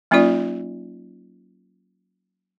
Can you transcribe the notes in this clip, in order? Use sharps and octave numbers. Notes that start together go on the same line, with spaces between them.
F#3 A#3 C#4 D#4 F4 D5